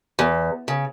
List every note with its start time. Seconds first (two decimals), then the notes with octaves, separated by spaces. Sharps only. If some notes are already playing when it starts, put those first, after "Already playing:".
0.19 E2
0.68 C#3